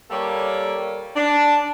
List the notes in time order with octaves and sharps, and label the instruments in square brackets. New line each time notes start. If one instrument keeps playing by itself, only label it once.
[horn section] G3 A#3 A4 C#5 D5
D4